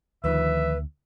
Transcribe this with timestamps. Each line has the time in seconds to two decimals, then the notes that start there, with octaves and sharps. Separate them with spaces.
0.24 D2 D#3 F3 B4 E5 E6